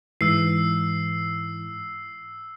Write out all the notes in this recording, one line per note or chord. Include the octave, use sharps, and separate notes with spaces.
G#2 E3 E6 C7